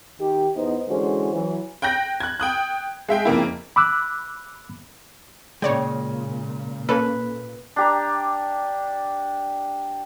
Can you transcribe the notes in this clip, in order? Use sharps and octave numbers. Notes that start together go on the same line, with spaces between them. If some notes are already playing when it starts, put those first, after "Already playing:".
D#3 G4
E2 B3 D#4 C5 D#5
D3 E3 G#3 C#4 F#4 C5
E3 F#3
G5 F#6 G6 A#6
F#6 G#6
G5 D#6 F#6
G#3 E5 G5
F2 C#3 A#3 E4
B5 D6 E6 F#6
A#2 C#3 G#3 C#5 D5 G5
A#3 C#4 A4 B4
D4 G4 A#5